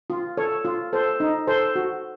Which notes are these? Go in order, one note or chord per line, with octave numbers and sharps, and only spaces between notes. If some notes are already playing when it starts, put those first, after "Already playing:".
F4
A4 C#5
F4
A4 C5
D#4
A4 C5
F#4